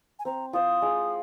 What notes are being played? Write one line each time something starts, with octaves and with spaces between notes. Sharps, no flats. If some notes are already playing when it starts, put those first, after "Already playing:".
G#5
C4 A#5
F4 C5 D#5 D#6
G#3